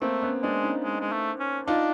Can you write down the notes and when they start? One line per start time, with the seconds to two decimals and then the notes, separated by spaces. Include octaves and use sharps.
0.02 A3 A#3 C4
0.23 B3 C#4
0.43 G#3 C4 D4
0.64 C#4 D#4
0.84 G#3
1.00 G#3
1.12 A3
1.40 C#4
1.67 D4 D#4 F4